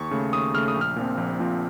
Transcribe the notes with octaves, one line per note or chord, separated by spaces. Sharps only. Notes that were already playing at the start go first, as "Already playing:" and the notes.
Already playing: D#2 C#6
C#3 A3
D#2 D#6
C#3 A3 F6
D#6
A#1
F6
A#2 F3 C4
A#1
A#2 F3 C4